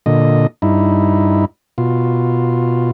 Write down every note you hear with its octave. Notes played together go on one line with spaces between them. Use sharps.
A#2 D3 D#5
G2 D#4 E4
B2 F4